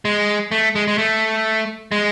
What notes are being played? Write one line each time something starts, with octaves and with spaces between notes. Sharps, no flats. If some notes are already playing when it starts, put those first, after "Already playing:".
G#3
A3
G#3
G#3
A3
G#3